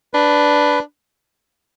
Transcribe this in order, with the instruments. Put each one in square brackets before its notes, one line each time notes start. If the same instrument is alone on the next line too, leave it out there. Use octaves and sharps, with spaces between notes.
[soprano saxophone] D4 [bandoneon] B4